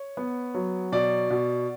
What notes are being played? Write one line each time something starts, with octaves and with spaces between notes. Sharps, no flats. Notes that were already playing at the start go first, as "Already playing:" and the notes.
Already playing: C#5
B3
F#3
B2 D5
B2